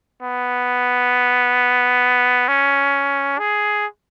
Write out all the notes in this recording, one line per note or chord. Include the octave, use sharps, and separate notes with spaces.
B3
C#4
G#4